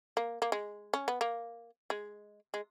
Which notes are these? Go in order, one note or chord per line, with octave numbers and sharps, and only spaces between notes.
A#3
A#3
G#3
C#4
B3
A#3
G#3
G#3